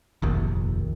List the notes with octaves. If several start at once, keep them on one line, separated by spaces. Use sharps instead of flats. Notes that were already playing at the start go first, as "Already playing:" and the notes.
F1 A#1 D#2